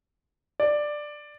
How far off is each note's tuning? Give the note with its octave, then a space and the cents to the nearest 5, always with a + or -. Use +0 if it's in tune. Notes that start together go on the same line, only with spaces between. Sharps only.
D5 +10